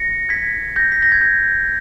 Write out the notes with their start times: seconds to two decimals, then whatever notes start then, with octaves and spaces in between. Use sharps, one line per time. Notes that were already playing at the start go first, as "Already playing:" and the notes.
Already playing: A#6 C#7
0.29 G#6 B6
0.76 G6 A#6
0.92 B6
1.02 A#6
1.12 G#6
1.21 G6